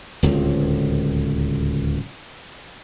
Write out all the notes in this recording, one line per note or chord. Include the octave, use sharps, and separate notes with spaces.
D1 C#2